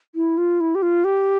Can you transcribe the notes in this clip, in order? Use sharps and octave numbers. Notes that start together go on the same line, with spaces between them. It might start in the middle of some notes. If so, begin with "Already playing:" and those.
E4
F4
E4
G4
F4
G4